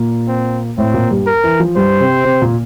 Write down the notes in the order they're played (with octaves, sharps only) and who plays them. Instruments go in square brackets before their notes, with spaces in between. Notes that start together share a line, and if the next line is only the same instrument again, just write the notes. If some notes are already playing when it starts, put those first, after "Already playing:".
Already playing: [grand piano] A#2 A#3
[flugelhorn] C4
[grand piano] A2 A3 [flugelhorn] C4
[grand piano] A#2 A#3
G2 G3
[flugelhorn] A#4
[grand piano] E3
F3
[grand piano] G2 G3 [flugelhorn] C5
[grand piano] C3 C4
C3 C4
A#2 A#3